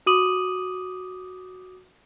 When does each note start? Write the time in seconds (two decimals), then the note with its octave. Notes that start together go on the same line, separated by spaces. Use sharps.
0.06 F#4 D6 D#6 D#7 F#7